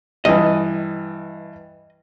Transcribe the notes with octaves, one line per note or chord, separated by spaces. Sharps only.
G2 E3 D#5